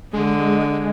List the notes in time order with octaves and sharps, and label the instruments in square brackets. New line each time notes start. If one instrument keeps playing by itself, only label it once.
[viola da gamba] D3 [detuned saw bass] G#3